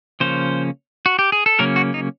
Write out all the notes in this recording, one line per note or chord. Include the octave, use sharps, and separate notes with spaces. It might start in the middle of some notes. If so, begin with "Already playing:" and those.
C#3 F3 A#3 C#4 C5
F#4
G4
G#4
A4
C#3 F#3 A#3 C#4 A#4
F#4
D#4